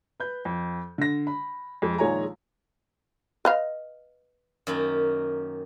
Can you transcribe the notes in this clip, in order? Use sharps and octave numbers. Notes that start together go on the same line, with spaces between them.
B4 G6
F2
D3 A#6
B5
F2 G#3
A#1 D#3 G#3 C#5 G#5 A#5
B4 D#5 F5
F#2 D#3 A#3